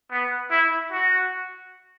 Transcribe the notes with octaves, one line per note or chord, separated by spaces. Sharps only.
B3
E4
F#4